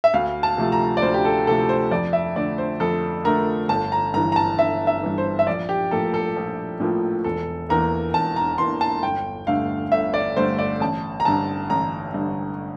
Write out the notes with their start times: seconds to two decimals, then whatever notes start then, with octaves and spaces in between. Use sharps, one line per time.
0.04 E5
0.14 D2 F5
0.43 A5
0.57 C3 F3 A3
0.72 A#5
0.97 D5
1.02 D2 C5
1.14 G4
1.25 A4
1.47 C3 F3 A3 A4
1.69 C5
1.91 F2 D5
2.13 E5
2.36 D3 A3 D5
2.58 C5
2.80 F2 A4
3.24 D3 A3 A#4
3.69 G1 A5
3.92 A#5
4.14 G2 E3 A#5
4.32 A#5
4.36 A5
4.58 G1 E5
4.87 E5
5.03 G2 E3
5.18 C5
5.39 E5
5.47 A#1 D5
5.69 G4
5.91 A2 F3 A#3 A4
6.14 A4
6.36 A#1
6.80 A2 F3 A#3
7.24 E1 A4
7.69 E2 E3 A#3 A#4
8.14 E1 A5
8.36 A#5
8.58 E2 E3 A#3 C6
8.81 A5
9.03 G1 G5
9.47 G2 D3 A3 F5
9.92 G1 E5
10.14 D5
10.36 G2 D3 A3 C5
10.59 D5
10.80 A1 A5
11.20 A#5
11.25 G2 D3 A5
11.70 A1 A#5
12.14 G2 D3